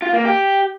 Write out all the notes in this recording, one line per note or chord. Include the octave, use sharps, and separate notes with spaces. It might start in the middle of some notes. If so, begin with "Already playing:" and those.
F4
A#3
G4